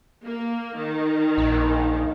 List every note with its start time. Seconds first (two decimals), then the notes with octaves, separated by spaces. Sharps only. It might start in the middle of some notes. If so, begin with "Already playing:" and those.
0.24 A#3
0.77 D#3
1.38 A#1